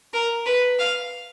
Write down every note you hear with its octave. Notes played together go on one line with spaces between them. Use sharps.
A#4
B4
F5